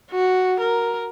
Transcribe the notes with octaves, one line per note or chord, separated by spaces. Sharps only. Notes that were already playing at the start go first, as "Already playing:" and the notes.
F#4
A#4